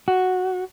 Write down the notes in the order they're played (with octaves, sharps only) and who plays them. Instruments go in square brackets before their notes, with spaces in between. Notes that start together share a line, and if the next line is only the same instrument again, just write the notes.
[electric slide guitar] F#4